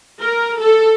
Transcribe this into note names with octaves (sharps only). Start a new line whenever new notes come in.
A#4
A4